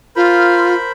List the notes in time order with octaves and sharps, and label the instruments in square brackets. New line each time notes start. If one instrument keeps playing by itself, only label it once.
[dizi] F4 [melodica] A#4 C5 B5